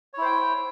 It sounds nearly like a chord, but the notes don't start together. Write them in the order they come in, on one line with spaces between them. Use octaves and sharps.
C#5 E4 C5 G5